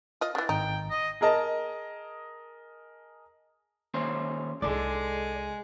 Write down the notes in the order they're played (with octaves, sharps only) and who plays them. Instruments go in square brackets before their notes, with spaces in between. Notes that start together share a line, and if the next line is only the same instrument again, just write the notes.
[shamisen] F4 D#5
[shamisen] C#3 E3 [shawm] D4
[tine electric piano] G#1 [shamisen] D#4 [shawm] G5
[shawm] D#5
[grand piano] G#4 A#4 D#5 A5
[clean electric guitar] D#2 C#4 C5
[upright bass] C2 D#4 [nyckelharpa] G#3 G#4 [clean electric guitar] A4 D5